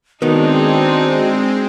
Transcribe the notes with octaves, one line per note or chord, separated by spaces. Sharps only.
D#3 G#3 B3 C4 D4 D#4 F#4